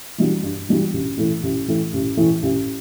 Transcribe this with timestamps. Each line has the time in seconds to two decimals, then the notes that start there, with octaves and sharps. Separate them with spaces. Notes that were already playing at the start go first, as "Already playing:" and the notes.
0.18 E3 G3 D4 F#4
0.43 G2
0.69 E3 G3 D4 F#4
0.93 A1
1.17 A2 E3 A3
1.43 A1
1.68 A2 E3 A3
1.93 A1
2.17 A2 E3 A3
2.43 A1